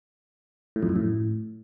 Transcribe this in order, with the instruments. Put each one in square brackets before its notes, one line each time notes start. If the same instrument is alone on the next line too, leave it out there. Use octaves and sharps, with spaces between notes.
[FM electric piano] A2
F2
F#2
A2